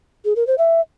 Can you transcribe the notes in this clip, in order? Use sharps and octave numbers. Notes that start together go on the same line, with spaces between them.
G#4
A#4
C5
E5